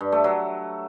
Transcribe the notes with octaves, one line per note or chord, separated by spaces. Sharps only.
G2
A3
F#3